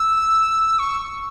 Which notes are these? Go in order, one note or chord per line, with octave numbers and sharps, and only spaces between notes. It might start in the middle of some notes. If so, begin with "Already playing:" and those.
Already playing: E6
C#6